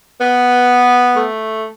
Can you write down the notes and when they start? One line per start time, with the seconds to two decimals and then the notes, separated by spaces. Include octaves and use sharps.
0.18 B3
1.16 A3